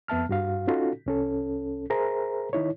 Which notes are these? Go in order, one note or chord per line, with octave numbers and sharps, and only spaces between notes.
F2 B3 E5 A5 F6
G2 F#4 F5
C#4 D#4 F4 F#4 A4
C2 C#4 A4
G#4 A#4 C5 E5 A#5
D#3 D#4 E4 C#5